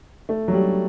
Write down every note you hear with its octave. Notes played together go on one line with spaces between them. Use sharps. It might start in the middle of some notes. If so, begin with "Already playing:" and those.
A3
F#3
G3